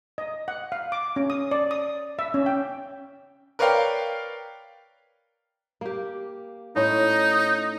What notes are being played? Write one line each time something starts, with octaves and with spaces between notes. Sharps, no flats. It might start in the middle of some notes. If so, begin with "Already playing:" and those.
D#5
F#5
F5
D6
C#4
D#6
D5
D#6
E5
C#4
G5
A#4 B4 C#5 D5 F5 G5
A#3 G4
A2 C#4 D#4